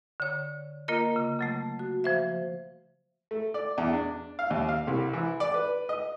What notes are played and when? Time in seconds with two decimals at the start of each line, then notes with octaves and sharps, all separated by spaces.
0.20 D3 C#5
0.88 A#3 F4 A#4 D#5
1.16 C#3
1.39 C#3 F#3 A3
1.79 F#4
2.04 F3 C5 E5
3.31 A3
3.54 D5
3.78 E2
3.93 D4
4.39 F5
4.50 D#2
4.69 F5
4.87 C2
5.13 E3
5.40 D5
5.54 B4
5.89 D#5